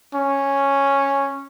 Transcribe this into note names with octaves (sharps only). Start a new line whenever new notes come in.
C#4